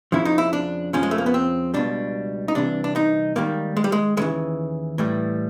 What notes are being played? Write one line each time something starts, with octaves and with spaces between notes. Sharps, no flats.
F2 C#3 F3 E4
D#4
E4
D4
F2 C#3 F3 C#4
G#3
A3
A#3
B3
C4
C#2 B2 G3 D4
D#4
C2 C3 E3 D4
D4
D#4
G#2 D#3 G3 A#3
G#3
G3
G#3
D#2 C#3 E3 G#3
A2 E3 G3